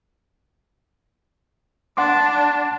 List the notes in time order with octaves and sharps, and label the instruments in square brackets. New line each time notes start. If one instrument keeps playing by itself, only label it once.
[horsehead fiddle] D4 [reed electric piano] F#5 C6 D6